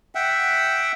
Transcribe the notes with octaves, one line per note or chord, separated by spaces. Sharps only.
E5 F#5 G5